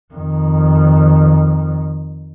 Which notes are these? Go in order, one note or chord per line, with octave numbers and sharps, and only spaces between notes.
F2 D#3